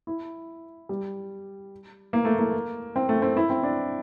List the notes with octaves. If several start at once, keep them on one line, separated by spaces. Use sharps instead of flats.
E4
G3
A#3
A3
A#3
C4
A3
C4
E4
C4
D4